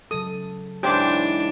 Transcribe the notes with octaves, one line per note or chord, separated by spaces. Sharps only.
C#3 F#3 A4 D#6
G#2 E3 D4 G4 C5 C#5 C6